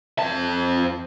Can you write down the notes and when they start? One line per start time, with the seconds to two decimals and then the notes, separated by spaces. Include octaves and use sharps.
0.19 F2 A5